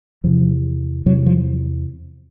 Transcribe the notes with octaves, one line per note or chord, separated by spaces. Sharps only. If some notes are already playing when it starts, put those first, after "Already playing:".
E2 C3 F3
E2 C3 F#3
F3